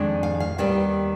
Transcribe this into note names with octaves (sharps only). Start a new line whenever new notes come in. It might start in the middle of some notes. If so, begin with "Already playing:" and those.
Already playing: F2 D#3 G#3 D4
F5
F5
D#2 D#3 G3 B3 G4